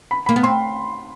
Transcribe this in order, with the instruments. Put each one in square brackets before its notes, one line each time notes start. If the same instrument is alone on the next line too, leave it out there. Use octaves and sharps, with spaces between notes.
[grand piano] B5
[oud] A#3 [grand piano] B5
[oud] B3
[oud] C4 [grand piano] C6